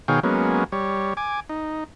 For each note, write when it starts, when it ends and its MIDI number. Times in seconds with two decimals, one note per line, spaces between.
0.08 0.20 47
0.08 0.20 51
0.08 0.20 68
0.08 0.20 73
0.08 0.20 77
0.08 0.20 79
0.23 0.64 54
0.23 0.64 56
0.23 0.64 58
0.23 0.64 59
0.23 0.64 61
0.72 1.14 55
0.72 1.14 73
1.17 1.40 80
1.17 1.40 86
1.49 1.84 63